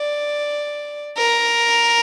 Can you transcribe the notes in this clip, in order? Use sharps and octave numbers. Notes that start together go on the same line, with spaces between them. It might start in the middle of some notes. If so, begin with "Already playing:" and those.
Already playing: D5
A#4